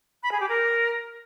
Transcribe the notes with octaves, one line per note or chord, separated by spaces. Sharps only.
B5
G#4
G4
A#4